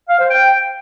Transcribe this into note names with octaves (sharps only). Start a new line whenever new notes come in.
F5
C5
G5